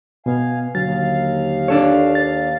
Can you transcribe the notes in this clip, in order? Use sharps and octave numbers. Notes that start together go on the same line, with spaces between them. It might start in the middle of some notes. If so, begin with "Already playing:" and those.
B2 B3 F5 G#5
D#2 D3 F#3 F5 A6
D4 A4 C#5
A6